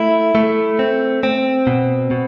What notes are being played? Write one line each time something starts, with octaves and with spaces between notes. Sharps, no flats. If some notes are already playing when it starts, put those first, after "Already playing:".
Already playing: A3 E4
A3
C4
C4
B2
B2